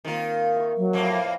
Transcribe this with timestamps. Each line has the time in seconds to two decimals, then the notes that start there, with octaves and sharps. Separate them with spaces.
0.05 D#3 A#3 C4 F4 A#4
0.56 E5 C#6
0.77 F#3
0.93 F2 A2 A#3
1.07 B4